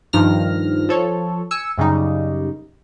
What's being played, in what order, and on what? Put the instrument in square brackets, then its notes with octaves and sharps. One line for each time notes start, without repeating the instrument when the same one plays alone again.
[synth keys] G2 D#3 F3 F6 A#6
F3 A4 C#5
G#5 E6 C#7
F#2 C#3 G3 D#4